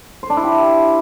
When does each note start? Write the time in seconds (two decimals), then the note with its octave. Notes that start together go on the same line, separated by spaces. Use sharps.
0.23 C5
0.30 D4
0.37 E4
0.44 G4